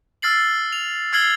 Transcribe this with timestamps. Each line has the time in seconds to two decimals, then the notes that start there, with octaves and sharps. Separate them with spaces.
0.22 E6 F6 A6 C7 F#7
0.72 F7
1.13 E6 F6 G#6 C7 F#7 G7